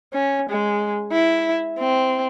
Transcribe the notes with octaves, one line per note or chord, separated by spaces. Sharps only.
C#4
G#3
E4
C4